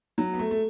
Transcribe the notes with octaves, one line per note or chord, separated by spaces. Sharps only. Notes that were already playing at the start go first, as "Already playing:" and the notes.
F#3
B3
A3
A3